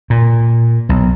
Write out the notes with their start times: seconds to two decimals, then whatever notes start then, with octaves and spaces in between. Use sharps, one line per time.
0.10 A#2
0.89 B1